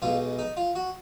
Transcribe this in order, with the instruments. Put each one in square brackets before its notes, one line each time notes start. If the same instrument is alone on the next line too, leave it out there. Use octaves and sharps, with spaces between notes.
[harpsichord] B1 B2 G#3 F4
D#4
F4
F#4